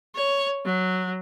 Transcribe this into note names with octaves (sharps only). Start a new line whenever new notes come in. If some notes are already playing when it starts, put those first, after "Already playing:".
C#5
F#3